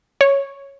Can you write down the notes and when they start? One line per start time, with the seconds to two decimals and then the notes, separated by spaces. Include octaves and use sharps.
0.21 C#5